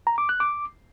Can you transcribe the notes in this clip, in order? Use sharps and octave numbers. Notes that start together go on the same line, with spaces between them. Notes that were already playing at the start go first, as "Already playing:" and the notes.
A#5
D6
F#6
D6